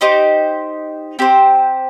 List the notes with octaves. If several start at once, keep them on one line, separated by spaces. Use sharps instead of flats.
D#4 G4 C5 D#5
C4 G4 C5